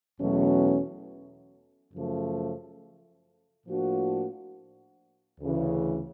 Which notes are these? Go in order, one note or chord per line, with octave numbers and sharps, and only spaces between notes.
E2 B2 F#3 A3 C#4
F#2 C#3 F3 A3
A2 F3 A#3 D4 F#4
D2 C#3 E3